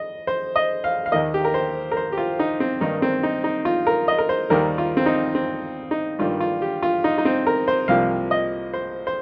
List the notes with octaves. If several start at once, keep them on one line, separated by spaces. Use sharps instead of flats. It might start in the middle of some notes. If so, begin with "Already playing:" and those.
Already playing: D#5
C5
D#5
F5
F5
D#2 D#3 A#3 D#5
G4
A#4
C5
A#4
C5
G4
F4
D#4
C4
G2 D#3 A#3 D#4
C4
D#4
D#4
F4
A#4
D#5
A#4
C5
D#2 D#3 G3 A#4
F4
C4
D#4
C4
D#4
G2 D#3 G3 A#3 F4
F4
G4
F4
D#4
D#4
C4
A#4
C5
C2 C3 F3 A#3 F5
D#5
C5
C5